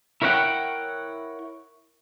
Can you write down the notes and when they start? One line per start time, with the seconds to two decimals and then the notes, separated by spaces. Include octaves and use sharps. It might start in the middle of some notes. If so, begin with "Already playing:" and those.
0.22 E4 A#4 C#5 E5 F#5 G5